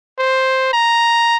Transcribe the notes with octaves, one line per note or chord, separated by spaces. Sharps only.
C5
A#5